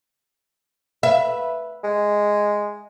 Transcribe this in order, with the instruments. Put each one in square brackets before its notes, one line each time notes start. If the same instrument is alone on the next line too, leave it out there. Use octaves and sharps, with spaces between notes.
[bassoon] B4 [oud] E5
[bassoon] G#3